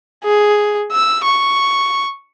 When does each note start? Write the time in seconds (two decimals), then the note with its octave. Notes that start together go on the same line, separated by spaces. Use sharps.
0.24 G#4
0.92 E6
1.23 C#6